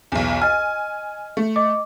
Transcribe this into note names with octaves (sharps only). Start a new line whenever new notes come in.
B1 E2
D#5 G#5 F6
A3
D#5 D6